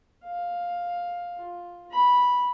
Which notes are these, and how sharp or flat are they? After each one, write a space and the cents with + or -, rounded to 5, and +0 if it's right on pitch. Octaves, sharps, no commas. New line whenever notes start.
F5 +10
F4 +5
B5 -10